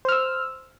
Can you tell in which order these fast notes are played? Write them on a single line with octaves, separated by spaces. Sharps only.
C5 F6 E6